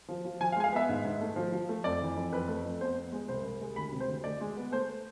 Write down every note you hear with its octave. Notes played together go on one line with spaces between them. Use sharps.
F3
F3
F3 G#5
F5
G#3 G#5
F5
B3 E5
G#2
G#2
A3
F3
F3
A3
F2 D5
E3
F2
F2 B4
A3
F2
B3 C5
B3
G#3
C2 C5
C2
G#3
D2 B5
C3
C5
D2
D2 D5
G#3
B3
A3 C5